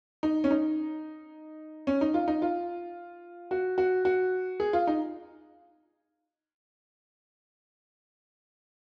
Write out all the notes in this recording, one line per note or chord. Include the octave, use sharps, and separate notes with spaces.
D#4
C#4
D#4
C#4
D#4
F4
D#4
F4
F#4
F#4
F#4
G#4
F4
D#4